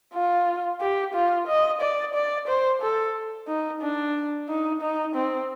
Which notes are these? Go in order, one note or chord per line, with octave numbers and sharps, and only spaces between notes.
F4
G4
F4
D#5
D5
D5
C5
A4
D#4
D4
D#4
D#4
C4